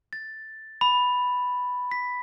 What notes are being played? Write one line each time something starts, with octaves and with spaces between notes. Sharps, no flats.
A6
B5
B6